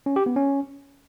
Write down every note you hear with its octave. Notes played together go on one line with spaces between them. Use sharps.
C#4
G4
B3
C#4